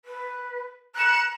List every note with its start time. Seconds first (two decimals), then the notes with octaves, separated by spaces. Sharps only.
0.05 B4
0.95 A#5 F#6 C#7 E7